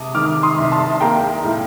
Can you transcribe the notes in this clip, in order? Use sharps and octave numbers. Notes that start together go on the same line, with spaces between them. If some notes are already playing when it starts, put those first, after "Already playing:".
Already playing: C3 A5 D6 D#6
D#3 D6 F6
C6 D#6
C2
A5 C6
A#3 G5 A#5
A2